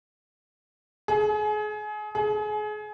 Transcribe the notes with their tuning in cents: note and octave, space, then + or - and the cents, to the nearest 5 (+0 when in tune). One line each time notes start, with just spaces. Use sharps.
G#4 +30
G#4 +30